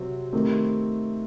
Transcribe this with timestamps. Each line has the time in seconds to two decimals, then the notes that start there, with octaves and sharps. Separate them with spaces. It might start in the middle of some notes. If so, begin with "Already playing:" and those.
Already playing: C3 F#3 C4
0.33 D#3 A3 C4 G4 A#4